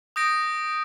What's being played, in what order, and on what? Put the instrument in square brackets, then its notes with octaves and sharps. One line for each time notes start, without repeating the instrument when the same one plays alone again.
[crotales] D#6 G6 A#6 D7